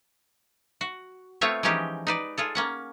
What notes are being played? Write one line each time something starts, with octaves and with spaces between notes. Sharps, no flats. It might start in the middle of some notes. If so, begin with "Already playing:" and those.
F#4
A3 B3 C4 F4 C#5 E5
E3 F3 G#3 C#4 D#4 G4
D#4 B4 D5
F4 G#4 A4
A#3 C#4 F#5